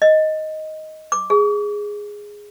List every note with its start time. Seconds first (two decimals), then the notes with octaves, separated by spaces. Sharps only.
0.02 D#5
1.12 D6
1.30 G#4